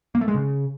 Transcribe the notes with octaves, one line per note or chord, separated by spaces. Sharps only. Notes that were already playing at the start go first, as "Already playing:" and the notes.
A#3
A3
G#3
C#3